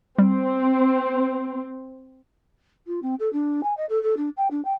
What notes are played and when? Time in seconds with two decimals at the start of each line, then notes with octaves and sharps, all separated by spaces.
0.18 G3 C4
2.87 F4
3.02 C4
3.19 A4
3.33 D4
3.63 G#5
3.77 D#5
3.89 A4
4.03 A4
4.17 D4
4.37 G5
4.50 D4
4.64 G5